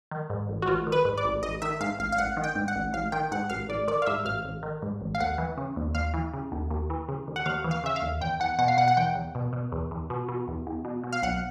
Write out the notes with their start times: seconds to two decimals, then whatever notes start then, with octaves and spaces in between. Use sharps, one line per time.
0.11 D#3
0.30 G#2
0.49 A1
0.62 F#4
0.67 A1 F4
0.87 D#3
0.92 B4
1.05 G#2
1.17 D5
1.24 A1
1.43 A1 D#5
1.62 D#3 E5
1.80 G#2 F5
1.99 A1 F5
2.12 F5
2.18 A1 F#5
2.37 D#3
2.44 G5
2.55 G#2
2.68 F#5
2.75 A1
2.93 A1 F5
3.12 D#3 G5
3.31 G#2 F#5
3.50 A1 F5
3.69 A1 D5
3.88 D#3 D5
4.02 F5
4.06 G#2 E5
4.25 A1 F5
4.45 A1
4.63 D#3
4.82 G#2
5.01 A1
5.15 F5
5.20 D#2 F#5
5.38 E3
5.57 C#3
5.76 D#2
5.95 D#2 F5
6.14 E3
6.34 C#3
6.52 D#2
6.71 D#2
6.90 E3
7.09 C#3
7.28 D#2
7.36 F#5
7.46 D#2 F5
7.64 E3
7.71 F5
7.84 C#3 E5
7.96 F5
8.02 D#2
8.21 E2 G5
8.40 E2 F#5
8.59 B2 F#5
8.68 F5
8.77 B2 F#5
8.88 F#5
8.97 E2 G5
9.15 E2
9.35 B2
9.53 B2
9.72 E2
9.91 E2
10.10 B2
10.28 B2
10.48 E2
10.67 E2
10.85 B2
11.04 B2
11.13 F5
11.22 B1 F#5